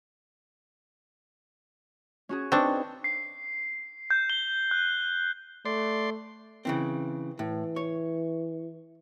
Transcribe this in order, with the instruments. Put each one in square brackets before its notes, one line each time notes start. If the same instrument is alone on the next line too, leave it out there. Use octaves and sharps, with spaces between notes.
[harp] C#4 F#4 G#4
[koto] C4 D4 [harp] D#4 B4 C#6
[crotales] C7
G6
G7
F#6
[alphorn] A3 [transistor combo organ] D5 C6
[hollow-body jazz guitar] C#3 E3 C4
[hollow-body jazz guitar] A2 [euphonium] E3
[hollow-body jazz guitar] C#5